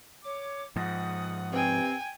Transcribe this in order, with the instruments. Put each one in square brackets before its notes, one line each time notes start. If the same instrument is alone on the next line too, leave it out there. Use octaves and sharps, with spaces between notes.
[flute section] C#5 D6
[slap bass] G#2 F3 [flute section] F#5 D#6
[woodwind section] G2 C3 C4 [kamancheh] G5 G#5